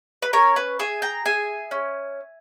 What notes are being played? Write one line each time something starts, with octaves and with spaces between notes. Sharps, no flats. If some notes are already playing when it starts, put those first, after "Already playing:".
B4
C#4 A#4 C#5
B4
G#4 E5 G#5
G5 A#5
G#4 E5 G#5
C#4